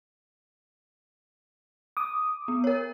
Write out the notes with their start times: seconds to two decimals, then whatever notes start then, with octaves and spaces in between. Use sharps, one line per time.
1.97 D6 D#6
2.48 B3
2.64 A#4 C#5